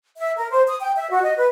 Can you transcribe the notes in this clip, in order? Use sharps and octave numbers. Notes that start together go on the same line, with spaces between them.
E5
A#4
C5
D#6
G5
E5
F#4
D#5
B4